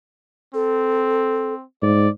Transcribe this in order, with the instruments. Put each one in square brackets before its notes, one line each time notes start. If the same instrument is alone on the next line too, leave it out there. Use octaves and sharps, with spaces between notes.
[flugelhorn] C4 [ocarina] A4
[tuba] G#2 [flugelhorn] D5